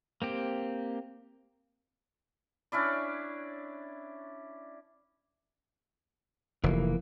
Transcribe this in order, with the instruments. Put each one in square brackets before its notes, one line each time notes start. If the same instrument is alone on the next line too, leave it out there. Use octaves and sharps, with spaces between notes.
[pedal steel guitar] A#3 C4 G4
[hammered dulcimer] C#4 D4 E4 D5
[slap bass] F1 [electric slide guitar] E3 A#3